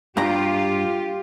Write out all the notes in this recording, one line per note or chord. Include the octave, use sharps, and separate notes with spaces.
G2 F4 G4 A#5